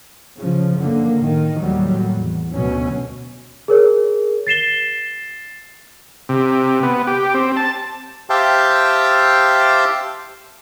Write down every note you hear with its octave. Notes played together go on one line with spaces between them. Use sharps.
C#3 F3
F#2 D3 A#3
A2 D#3
D#2 A2 F#3 G3
E2
D2 B2 F#3 C#4
G#4 A#4 C#5
A6 C7 E7 G7
C3
B3
G4
C4
A5
G4 C5 E5 F5 G5 A5